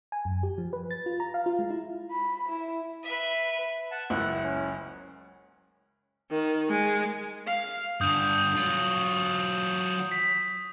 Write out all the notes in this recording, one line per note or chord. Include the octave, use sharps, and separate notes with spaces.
G#5
F#2
G4
F3
B4
A6
F4
A#5
F5
F4
G#3
E4
B5
E4
B4 E5
F#5 A5
F#1 C#2 E4 F#5
C#4
D#3
G#3
F5
G2 D3 D#6 G6
F#3 F4
B6